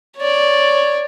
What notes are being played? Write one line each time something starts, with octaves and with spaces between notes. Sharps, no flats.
C#5 D5